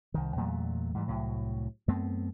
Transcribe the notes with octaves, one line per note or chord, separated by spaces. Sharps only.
C2 D#3
E2 A#2 F#3 A3
G#2 E3 G3
C2 A2 F#3
F#2 A3 B3 C4